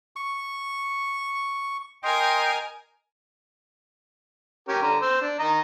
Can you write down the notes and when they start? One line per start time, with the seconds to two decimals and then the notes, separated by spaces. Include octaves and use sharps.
0.16 C#6
2.03 A#4 D#5 G5 G#5 C6
4.68 C#4 G4 A#4
4.82 D3 A#5
5.02 C5 E6
5.21 D4
5.39 D#3 D#5 A#5